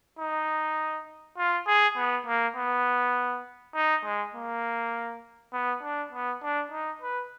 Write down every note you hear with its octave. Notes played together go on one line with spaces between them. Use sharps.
D#4
F4
G#4
B3
A#3
B3
D#4
G#3
A#3
B3
D4
B3
D4
D#4
B4